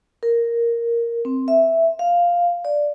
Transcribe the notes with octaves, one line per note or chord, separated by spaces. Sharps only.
A#4
C4
E5
F5
D5